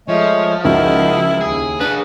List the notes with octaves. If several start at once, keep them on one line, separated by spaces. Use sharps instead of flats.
F3 G#3 A3 C#5 D#5
C#2 D#4 E4 F#4 A#4
D#2 G#4
D4 G#4 B4